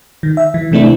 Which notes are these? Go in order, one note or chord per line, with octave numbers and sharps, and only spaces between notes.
D#3
E5
E3
C3 E3 A3 C4 D4 E4